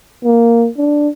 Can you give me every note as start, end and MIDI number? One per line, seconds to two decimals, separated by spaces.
0.24 0.68 58
0.78 1.09 62